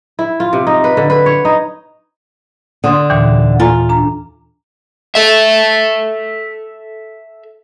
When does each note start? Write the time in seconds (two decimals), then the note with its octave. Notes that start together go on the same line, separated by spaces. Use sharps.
0.19 E4
0.40 F4
0.53 C3
0.67 D#4
0.84 B4
0.97 D3
1.10 B4
1.26 C#5
1.45 D#4
2.84 D3 C6 D#6
3.10 D#2 A#2 E3
3.60 F4 A4 G#5 A#5
3.89 D4 A#5
5.15 A4 E5